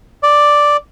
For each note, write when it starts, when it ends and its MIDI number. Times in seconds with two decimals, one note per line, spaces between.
0.23 0.77 74